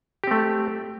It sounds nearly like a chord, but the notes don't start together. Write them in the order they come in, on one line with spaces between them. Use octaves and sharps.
G4 C4 A3